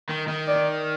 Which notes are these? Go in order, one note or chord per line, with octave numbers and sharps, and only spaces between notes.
D#3
D#3
D5